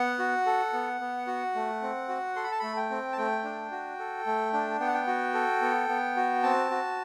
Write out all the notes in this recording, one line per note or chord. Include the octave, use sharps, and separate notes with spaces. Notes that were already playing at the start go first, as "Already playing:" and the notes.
Already playing: B3 F#5
F#4
A4
B3
B3
F#4
A3
C4
F#4
A4 C6
B5
A5
A3 B5
G5
C4
A5
A3 G5
D4
F#4
A4
A3
D4
B3 G5
F#5
G5
F#4
A4
B3
B3
F#4
C4 A5
F#4